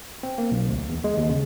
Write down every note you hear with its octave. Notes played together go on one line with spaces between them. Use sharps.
C4
A#3
B1
D2
E2
G#3
D#2
C#3